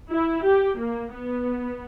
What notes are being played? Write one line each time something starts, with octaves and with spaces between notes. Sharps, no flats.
E4
G4
A#3
B3